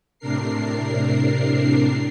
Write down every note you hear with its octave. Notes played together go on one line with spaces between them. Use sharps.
A2 C3 D4 A#4 C7